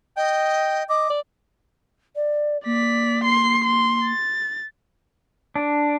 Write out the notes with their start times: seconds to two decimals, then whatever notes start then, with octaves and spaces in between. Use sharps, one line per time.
0.17 D#5 G5
0.89 D#5 D6
1.10 D5
2.15 D5
2.65 A#3 D5 B6
3.24 C6 C7
3.64 C6
4.05 A6
5.56 D4